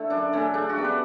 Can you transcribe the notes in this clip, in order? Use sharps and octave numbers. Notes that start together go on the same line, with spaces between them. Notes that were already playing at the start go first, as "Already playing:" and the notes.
Already playing: D3 A3 E4
F#2 D4
D3 A3 C#4
C#3 D4
F#4
G3 B3
B4